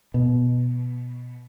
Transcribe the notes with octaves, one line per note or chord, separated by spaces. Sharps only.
B2